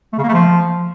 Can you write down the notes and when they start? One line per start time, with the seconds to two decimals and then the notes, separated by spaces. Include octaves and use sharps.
0.13 A3
0.18 C#3
0.23 A#3
0.28 A3
0.33 F3